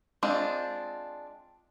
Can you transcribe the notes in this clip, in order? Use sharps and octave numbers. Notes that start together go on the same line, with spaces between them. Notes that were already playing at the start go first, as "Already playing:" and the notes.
G#3 C4 D4 F4